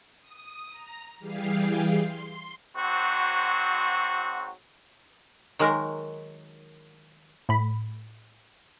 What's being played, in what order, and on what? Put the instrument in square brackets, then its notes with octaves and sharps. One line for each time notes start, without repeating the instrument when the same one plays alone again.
[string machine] D#6
A#5
E3 G3 G4 G#4 F5 C7
C6
[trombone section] G#2 F#3 C4 F#4
[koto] D#3 F#3 G#3 A#4
[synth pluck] A2 B5